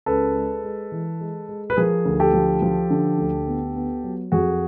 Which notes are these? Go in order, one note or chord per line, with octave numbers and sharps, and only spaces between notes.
C#2 A4 B4
G#3
G#3
E3
G#3
G#3
B4
F3 G#4 A#4
D2
G4 A4
F3
F3
D3
D2
B3
B3
F#3
F2 F#4 G#4